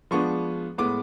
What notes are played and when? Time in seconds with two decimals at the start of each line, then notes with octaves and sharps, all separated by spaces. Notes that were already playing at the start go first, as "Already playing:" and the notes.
0.11 F3 G#3 B3 D4 C#6
0.78 A2 G#3 B3 D6